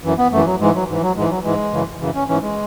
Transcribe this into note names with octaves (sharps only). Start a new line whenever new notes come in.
F#2 E3
B3
F#2 E3 A3
F#3
G#2 E3 G#3
F#3
G#2 E3
F#3
G#2 E3 G#3
F#3
G#2 E3 G#3
F#2 C#3 E3
F#2 C#3 E3
C#4
G#2 E3 C#4
G#3